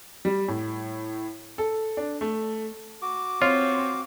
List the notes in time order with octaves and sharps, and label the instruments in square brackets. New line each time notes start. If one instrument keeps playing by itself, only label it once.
[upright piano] G3
A2
A4
D4
A3
[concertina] F#4 D6
[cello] C4 [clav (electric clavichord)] F4 [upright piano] C#5